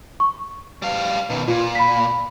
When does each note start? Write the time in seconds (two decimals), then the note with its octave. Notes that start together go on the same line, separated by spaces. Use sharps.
0.20 C#6
0.82 G3 F5
1.30 B2 D#3
1.48 A#2 F4
1.75 B5 B6